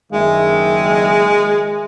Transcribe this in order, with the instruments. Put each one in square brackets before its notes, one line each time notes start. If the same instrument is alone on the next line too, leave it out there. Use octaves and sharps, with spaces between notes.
[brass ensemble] F#1 D#3 E5 [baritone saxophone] G#3